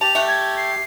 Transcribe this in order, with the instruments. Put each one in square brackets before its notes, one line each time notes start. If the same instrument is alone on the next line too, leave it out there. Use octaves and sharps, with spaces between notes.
[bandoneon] G4 [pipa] A5 [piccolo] F7
[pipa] A3 F#5
[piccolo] G#6
C7